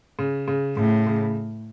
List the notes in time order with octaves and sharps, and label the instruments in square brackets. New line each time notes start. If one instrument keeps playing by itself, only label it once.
[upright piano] C#3
C#3
[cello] A2 [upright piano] C#3
[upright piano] C#3